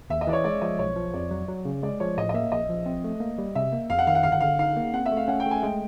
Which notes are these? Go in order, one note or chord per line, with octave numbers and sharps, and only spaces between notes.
D#2 E5
D#5
E3 D5
C#5
G#3 D5
F3 D#5
B1 C#5
F3
F2 D5
F#3
F#3
C#3
G#3 D5
F3 C#5
A2 D#5
D#5
A#3 E5
A#1 D#5
F3
C4
A3
A#3
G3
C3 E5
A#3
F2 F5
F#5
D#3 F5
F#5
G1 F5
F#5
D3 F5
D#4 F5
A#3
C4 F#5
E5
A3
F5
C#4 F#5
G5
A3
G#5
G#3 G5